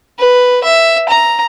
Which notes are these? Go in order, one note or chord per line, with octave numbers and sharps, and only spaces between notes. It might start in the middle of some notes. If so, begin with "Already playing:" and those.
B4
E5
A#5